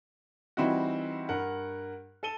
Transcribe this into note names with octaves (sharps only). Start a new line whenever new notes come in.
E3 G3 C4 D#4 E4 F#4
G2 A#4 F#5
A4 A5 D#7 G7